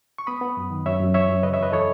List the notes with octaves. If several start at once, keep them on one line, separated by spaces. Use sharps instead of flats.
C#6
B3 B5 D#6
B3
F#2
D#3
F#2 C#5 E5
F#2
E3 C#5 E5
F#2
C#3 B4 D#5
C#5 E5
E2 B4 D#5
E3 A4 C#5